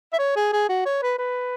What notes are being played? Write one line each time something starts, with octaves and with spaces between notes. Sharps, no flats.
E5
C#5
G#4
G#4
F#4
C#5
B4
B4